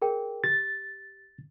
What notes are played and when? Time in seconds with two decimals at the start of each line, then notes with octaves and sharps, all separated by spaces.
0.02 G#4 A#4 G5
0.44 G4 A6